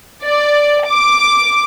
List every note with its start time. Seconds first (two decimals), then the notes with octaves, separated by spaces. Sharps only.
0.23 D5
0.87 D6